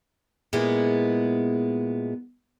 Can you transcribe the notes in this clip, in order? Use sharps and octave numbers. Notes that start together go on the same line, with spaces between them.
A#2 G#3 B3 E4